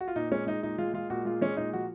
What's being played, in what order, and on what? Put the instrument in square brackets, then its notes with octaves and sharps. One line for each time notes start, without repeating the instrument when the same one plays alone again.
[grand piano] F#4
F4
A#2 D#4
G#3 C#4
G#3 D#4
A#2 D#4
G#3 F4
G#3 F4
A#2 F#4
G#3 F4
G#3 C#4
A#2 D#4
F3 F#4